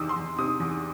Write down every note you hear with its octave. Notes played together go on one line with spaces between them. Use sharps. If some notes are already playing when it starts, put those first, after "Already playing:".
Already playing: E2 C3 D#3 D#6 E6
C6
E2
C3 D#6
E2